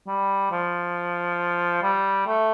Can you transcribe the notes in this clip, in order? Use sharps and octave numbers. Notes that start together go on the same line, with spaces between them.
G3
F3
G3
A3